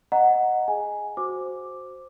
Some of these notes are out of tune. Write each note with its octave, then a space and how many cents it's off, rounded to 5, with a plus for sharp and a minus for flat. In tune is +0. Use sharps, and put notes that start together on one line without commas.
D#5 +0 F#5 +0 A#5 +0
G#4 +0 G#5 +0
F#4 +0 C5 +0 D6 +0